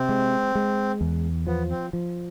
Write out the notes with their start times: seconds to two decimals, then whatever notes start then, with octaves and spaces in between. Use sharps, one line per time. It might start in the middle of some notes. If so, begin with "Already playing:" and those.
Already playing: C3 C4
0.09 G#3
0.55 G#3
1.01 E2
1.47 F3 B3
1.70 C4
1.93 F3